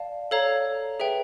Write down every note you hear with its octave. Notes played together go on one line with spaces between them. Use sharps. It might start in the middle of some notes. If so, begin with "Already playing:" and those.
Already playing: D5 F5 A5
A4 C#5 F5 A#5
G#4 B4 E5 G5